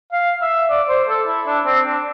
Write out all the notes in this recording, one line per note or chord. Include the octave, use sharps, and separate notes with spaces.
F5
E5
D5
C5
A4
E4
D4
C4
D4